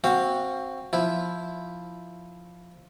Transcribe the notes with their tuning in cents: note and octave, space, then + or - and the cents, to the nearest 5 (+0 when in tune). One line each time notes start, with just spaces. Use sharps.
C4 +15 F#4 +0 F5 -25
F3 +0 E4 +0